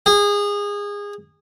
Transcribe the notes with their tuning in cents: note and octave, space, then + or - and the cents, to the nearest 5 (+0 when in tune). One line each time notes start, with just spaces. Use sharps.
G#4 -25